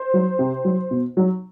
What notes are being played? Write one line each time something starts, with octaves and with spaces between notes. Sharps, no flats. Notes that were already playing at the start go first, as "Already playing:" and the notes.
Already playing: C5
F#3
C3
F#3
B2
F#3